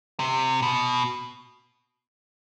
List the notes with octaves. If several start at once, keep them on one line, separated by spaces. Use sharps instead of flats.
C3
B2